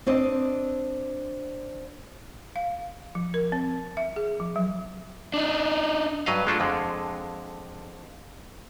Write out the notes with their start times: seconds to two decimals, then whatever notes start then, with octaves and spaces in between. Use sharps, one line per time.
0.07 C4 D4 C5 D5 D#5
2.56 F5
3.15 F3
3.34 A#4
3.52 C4
3.97 E5
4.16 G#4
4.40 F3
4.56 F#3
5.34 D4 D#4
6.26 G2 F#3 B4 D#5 F5
6.47 G#3 A3 D4 F4 A4
6.60 F2 D3 G#3